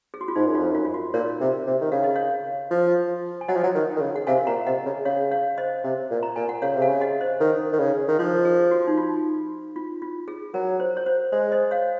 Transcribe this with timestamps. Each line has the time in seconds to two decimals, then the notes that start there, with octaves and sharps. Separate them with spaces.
0.14 G#4
0.21 F#4
0.28 F4
0.36 G#2 D#4
0.47 F#2
0.55 F4
0.59 F2
0.71 F#2 F4
0.85 F4
0.94 F#4
1.13 A#2 A#4 C#5
1.40 C3
1.66 C3
1.81 D#3
1.92 C#3 F5
2.04 D#5
2.16 C#5 F5
2.71 F3
3.41 G#5
3.48 F#3 D#5 F#5
3.56 F3
3.63 F#3
3.75 D#3
3.96 D#3
4.01 C#3
4.16 F#5
4.27 C3 F5 G#5
4.47 A#2 F#5 A#5
4.66 C3 D#5 F#5
4.85 C#3
5.05 C#3 C#5 F5
5.31 C#5 F5
5.58 C5 D#5
5.84 C3
6.10 A#2
6.23 A#5
6.36 A#2 G#5
6.49 F#5
6.62 C#3 C#5 F5
6.75 C3
6.82 F5 G#5
6.87 C#3
7.01 D#5 F#5
7.21 C5 D#5
7.40 D#3
7.72 D#3
7.79 C#3
8.08 D#3
8.19 F3 C5
8.45 G#4
8.71 F#4
8.87 D#4
8.97 F4
9.76 F4
10.02 F4
10.28 G#4
10.54 F#3 A#4
10.80 C5
10.97 C#5
11.06 C5
11.32 G#3 C5
11.52 C5 D#5
11.71 C#5 F5